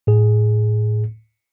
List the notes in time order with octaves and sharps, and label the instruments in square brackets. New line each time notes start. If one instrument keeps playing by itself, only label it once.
[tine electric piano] A2 G#4